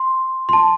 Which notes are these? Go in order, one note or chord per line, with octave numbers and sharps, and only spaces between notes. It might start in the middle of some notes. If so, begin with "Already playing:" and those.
Already playing: C6
C6
A5